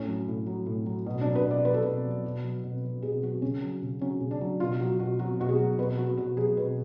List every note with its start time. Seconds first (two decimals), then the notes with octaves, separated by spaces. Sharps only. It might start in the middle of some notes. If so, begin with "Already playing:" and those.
Already playing: A2 C#4
0.08 F#3
0.28 A2
0.47 F#3
0.67 A2
0.86 F#3
1.06 B2
1.21 F#3 D4
1.35 B4
1.45 B2
1.51 D5
1.65 F#3 B4
1.74 A4
1.83 B2 B4
2.05 F#3
2.25 B2
2.44 F#3
2.64 B2
2.84 F#3
3.02 B2 G#4
3.22 F#3 F#4
3.42 C#3 C#4
3.62 F#3
3.82 C#3
4.01 F#3 C#4
4.21 C#3
4.31 D4
4.41 F#3
4.60 B2 F4
4.80 F#3 F#4
4.99 B2 F#4
5.19 F#3 F#4
5.40 B2 F#4
5.49 G#4
5.58 F#3
5.79 B2 B4
5.98 F#3 F#4
6.17 B2 F#4
6.37 F#3 G#4
6.57 B2 B4